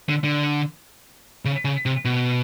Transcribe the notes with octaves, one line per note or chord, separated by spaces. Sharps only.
D3
D3
C#3
C#3
C3
B2